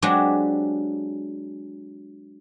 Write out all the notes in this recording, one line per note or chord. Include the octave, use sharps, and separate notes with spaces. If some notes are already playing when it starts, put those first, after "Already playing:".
F#3 G#3 C4 D4 G4 G#4